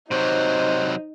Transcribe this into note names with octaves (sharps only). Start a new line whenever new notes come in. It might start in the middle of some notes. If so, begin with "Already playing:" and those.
C3 F#3 D#4 C5